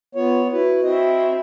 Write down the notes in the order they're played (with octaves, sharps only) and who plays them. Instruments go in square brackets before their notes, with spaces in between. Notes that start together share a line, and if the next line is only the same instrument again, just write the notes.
[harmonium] B3 C#5 [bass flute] F4
[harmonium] E4 B4 [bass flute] F#4
[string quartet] C4 E4 [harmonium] D#5